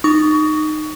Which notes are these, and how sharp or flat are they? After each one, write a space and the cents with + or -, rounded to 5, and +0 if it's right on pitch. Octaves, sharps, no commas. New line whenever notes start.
D#4 -20 C#6 +25